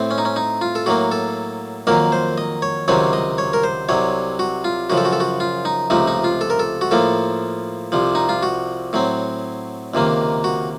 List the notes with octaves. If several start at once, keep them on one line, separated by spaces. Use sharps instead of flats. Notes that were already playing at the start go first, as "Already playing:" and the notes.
Already playing: A2 A3 C4
C#4
D#4
C#4
D#4
F4
A4
A2 F#3 A#3 F#4
A4
F2 D#3 F#3 A#3 A#4
C5
D#5
C#5
C#2 C3 D#3 F#3 C4 C#5
D#5
C#5
A#4
C5
C2 C3 F#3 C#5
F#4
F4
F#2 C#3 F3 F#4
A4
F#4
A4
F#4
F4
D#4
C#2 C3 F3 A3 D#4
D#4
F4
A4
A#4
A4
F#4
A2 F3 A#3 A4
C2 C3 F3
D#4
F4
F#4
A2 F#3 C4
C#2 C3 D#3 A#3
F#4